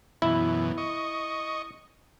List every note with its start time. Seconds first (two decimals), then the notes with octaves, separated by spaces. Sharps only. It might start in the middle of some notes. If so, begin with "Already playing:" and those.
0.22 F#2 B2 E3 E4
0.78 D#5 C#6